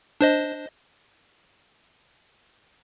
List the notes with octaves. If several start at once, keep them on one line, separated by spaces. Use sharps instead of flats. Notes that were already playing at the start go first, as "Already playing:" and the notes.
D4 C5 D#5